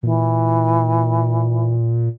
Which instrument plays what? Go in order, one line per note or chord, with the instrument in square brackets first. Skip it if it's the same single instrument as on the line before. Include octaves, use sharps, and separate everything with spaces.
[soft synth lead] A#2 [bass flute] E3